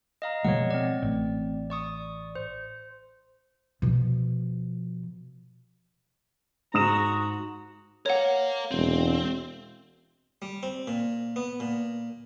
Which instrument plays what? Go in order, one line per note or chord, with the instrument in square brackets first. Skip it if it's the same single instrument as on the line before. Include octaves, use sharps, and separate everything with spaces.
[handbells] D#5 F5 A#5
[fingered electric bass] B2 F3 G#3 [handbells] C#5 D#5 F#5
[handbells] C4 D5
[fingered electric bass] A1
[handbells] D5 C#6 D#6
C5
[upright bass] B2 F3
[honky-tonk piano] G#2 D#6 E7 [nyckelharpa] F#4 A#5
[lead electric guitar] A#4 F5 [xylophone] C#5 F#5
[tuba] E1 [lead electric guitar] C4
[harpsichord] G3
C4
A#2
B3
A#2